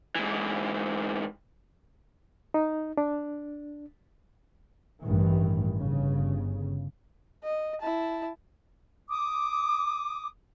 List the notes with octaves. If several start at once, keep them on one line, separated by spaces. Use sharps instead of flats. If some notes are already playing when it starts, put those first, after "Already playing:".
G#2 E3
D#4
D4
A1 G2 D#3 E3
G1 C#3
D#5
E4 A5
D6 D#6